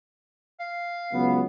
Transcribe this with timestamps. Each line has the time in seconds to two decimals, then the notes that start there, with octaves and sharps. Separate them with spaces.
0.60 F5
1.13 C#2 F#3 B3